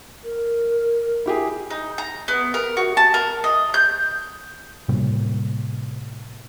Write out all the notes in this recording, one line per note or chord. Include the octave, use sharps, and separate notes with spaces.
A#4
E4 G4 G#4
D#4
A#5
B3
A#4
F#4
A5
A#4
D#5
G6
A2 C3 G3 A#3